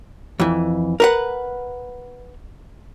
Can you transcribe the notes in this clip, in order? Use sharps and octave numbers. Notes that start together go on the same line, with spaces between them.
F2 E3
A#4 B4 F#5